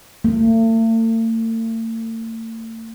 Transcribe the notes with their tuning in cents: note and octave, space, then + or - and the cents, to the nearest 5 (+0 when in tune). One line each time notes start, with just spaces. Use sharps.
A3 +45